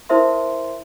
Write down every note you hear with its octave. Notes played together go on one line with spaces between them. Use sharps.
E4 A#4 C5 E5 C6